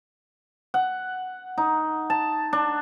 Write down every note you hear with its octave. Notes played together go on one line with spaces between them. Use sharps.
F#5
D#4
A5
D4